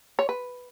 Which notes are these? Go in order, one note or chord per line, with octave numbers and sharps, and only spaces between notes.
C#5
B4